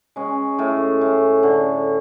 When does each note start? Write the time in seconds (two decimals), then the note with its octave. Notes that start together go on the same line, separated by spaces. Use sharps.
0.16 G#3 C#4
0.58 A2
1.01 A2
1.43 D3